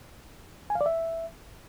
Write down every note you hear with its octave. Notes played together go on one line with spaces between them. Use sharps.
G#5
F5
D5
E5